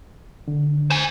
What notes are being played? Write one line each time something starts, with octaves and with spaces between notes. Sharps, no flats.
D3
C5 G#5